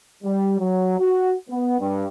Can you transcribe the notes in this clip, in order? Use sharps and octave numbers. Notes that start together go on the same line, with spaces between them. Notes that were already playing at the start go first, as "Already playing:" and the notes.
G3
F#3
F#4
B3
G2